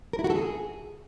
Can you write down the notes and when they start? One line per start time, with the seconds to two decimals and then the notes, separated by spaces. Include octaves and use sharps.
0.13 A#4
0.19 E4
0.24 F#4
0.30 A4
0.35 G#4